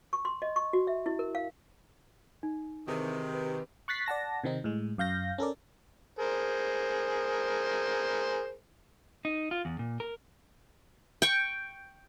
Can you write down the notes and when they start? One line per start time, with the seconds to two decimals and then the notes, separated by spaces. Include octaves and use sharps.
0.13 C#6
0.25 C6
0.42 D#5
0.56 C#6
0.73 F#4
0.87 E5
1.06 E4
1.19 A#4
1.35 F5
2.43 D#4
2.88 C3 D#3 E3 C4 G4 G#4
3.34 B4
3.88 C#6 F#6 A6 B6 C7
4.06 D5 F#5 A5 A#6
4.44 C3 D#3 C4 D#4
4.64 A2 G#3
4.98 F#2 F5 G6 A#6
5.38 C#4 A4 A#4 D5
6.19 G#4 A#4 C5
9.25 D#4
9.51 F4
9.65 E2
9.79 A#2
10.00 A#4
11.22 G5 C#6